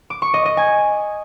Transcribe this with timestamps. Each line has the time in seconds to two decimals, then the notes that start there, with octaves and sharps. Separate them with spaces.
0.10 D6
0.22 C#6
0.34 D#5
0.46 D#5
0.57 G#5